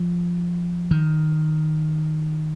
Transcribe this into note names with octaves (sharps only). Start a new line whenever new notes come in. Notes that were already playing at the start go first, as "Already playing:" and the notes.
Already playing: F3
D#3